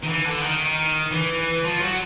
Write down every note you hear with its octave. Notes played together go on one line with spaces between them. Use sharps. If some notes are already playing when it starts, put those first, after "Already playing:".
D#3
E3
D3
D#3
E3
F3
F#3